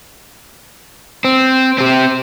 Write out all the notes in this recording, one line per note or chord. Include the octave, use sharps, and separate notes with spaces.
C4
C4 G4